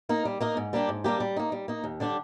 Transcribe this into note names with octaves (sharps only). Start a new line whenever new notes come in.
A#3 D#4 A#4
G3
A#3 D#4 A#4
G#2
G3 A#3 D4 G4
G#2
G3 A#3 D4 G4
G3
A#3 D#4
G3
A#3 D#4
D#2
D3 G3 D4 G4